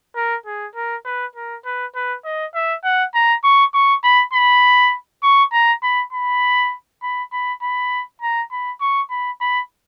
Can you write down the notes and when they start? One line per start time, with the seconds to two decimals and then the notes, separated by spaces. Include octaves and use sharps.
0.15 A#4
0.46 G#4
0.75 A#4
1.05 B4
1.36 A#4
1.65 B4
1.96 B4
2.25 D#5
2.55 E5
2.84 F#5
3.14 A#5
3.44 C#6
3.74 C#6
4.04 B5
4.33 B5
5.23 C#6
5.52 A#5
5.83 B5
6.13 B5
7.03 B5
7.33 B5
7.62 B5
8.22 A#5
8.52 B5
8.81 C#6
9.11 B5
9.41 B5